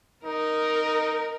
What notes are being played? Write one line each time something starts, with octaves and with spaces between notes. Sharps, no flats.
D#4 A#4